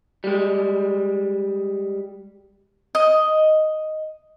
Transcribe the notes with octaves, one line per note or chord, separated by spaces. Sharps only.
G3 G#3
D#5